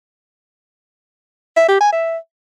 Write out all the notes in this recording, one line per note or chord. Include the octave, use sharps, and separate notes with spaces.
E5
G4
G#5
E5